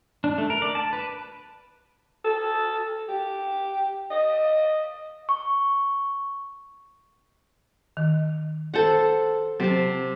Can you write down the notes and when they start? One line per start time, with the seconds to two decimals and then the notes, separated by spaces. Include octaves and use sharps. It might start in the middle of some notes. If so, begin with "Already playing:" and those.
0.24 D4
0.38 A3
0.50 A#4
0.62 D5
0.75 A5
0.93 B4
2.24 A4
3.08 G4
4.11 D#5
5.29 C#6
7.97 D#3
8.74 A4 C5 F#5
9.60 C3 F#3 C4 A5